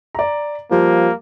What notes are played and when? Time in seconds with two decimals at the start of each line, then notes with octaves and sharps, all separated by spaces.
0.15 D5 A#5
0.71 F3 G3 A#3